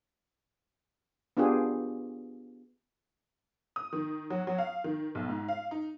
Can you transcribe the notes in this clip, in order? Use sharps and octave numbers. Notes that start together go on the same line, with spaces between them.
B3 D4 F4 G4 G#4
D#6
D#3
F#3
F#3
F5
D#3
B1
G#2
F5
D#4